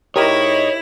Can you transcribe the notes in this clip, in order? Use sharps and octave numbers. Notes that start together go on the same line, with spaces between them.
G#2 E4 G4 A#4 C#5 D#5 C#6 D#6